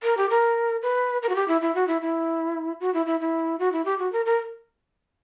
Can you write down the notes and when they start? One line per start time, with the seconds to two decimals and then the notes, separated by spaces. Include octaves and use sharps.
0.03 A#4
0.17 G4
0.30 A#4
0.82 B4
1.23 A#4
1.29 F#4
1.35 G4
1.48 E4
1.61 E4
1.75 F#4
1.88 E4
2.02 E4
2.80 F#4
2.94 E4
3.06 E4
3.20 E4
3.59 F#4
3.72 E4
3.85 G4
3.99 F#4
4.12 A#4
4.26 A#4